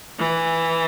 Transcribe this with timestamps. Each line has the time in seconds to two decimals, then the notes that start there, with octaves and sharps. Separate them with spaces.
0.19 E3